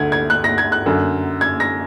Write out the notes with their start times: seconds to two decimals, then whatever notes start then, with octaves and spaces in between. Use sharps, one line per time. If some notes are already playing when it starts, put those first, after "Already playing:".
Already playing: D2 D3 G#6
0.12 G#6
0.30 F#6
0.44 A#6
0.58 G#6
0.72 F#6
0.86 F#2 D3
1.41 G#6
1.60 A#6